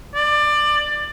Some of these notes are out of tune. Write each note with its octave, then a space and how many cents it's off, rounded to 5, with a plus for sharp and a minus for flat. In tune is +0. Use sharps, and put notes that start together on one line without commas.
D5 +20